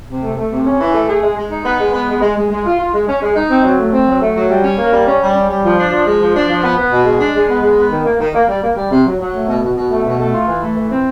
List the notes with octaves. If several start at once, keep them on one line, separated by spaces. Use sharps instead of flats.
C3
A3
A3
C3
C#4
E3
A3
G#4
G#3
G#3
D#4
B3
G#3
B3
G#3
G#3
G#3
G#3
F4
F4
G#3
C#4
G#3
D#4
C4
F#3
A3
C4
F#3
A3
F#3
G3
C#4
A#3
G3
C#4
G3
C#4
G3
F3
D4
F3
G#3
F3
D4
F3
B3
B3
B2
G#3
D4
G#3
B3
G#3
B3
D#3
A#3
D#3
A#3
G3
A#3
G3
C3
F#3
F#3
A3
B2
B2
B2
A3
B2
A3
F4
E3
A3
E3
C4